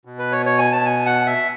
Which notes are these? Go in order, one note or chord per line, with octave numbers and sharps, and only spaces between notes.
B2
B4
C#5
C#5
G#5
A5
G#5
F#5
E5